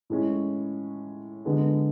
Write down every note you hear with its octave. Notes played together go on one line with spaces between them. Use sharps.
A2 G#3 C#4
D3 G#3 B3